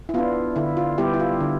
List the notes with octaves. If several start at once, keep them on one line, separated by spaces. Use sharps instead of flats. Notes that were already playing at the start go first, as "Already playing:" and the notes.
E4
B3 D4 F4
D3 E4
F4
G3 B3 E4 G4
E4
F4
D3